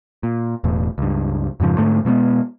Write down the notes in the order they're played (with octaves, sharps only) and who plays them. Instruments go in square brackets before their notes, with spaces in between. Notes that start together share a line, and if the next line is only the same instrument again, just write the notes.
[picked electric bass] A#2
E1 E2 A2
C#2 G2
F2 G#2 C#3 F3
G#2 D3 A3
B2 G#3 A#3 B3